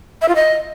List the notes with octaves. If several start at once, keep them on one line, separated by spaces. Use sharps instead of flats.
E5
F4
D#5